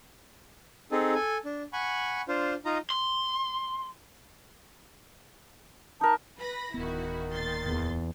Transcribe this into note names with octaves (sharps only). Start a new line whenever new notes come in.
C4 D#4 G#4 A4
A4 G#5
D4
F#5 G#5 B5 C#6
D4 F4 C5
D#4 F4 D#5 A#5
C6
D#4 A#4 A5
B4 B5 A#6
D1 D#3 B3 E4 F#4
A#2 C6 A6
E2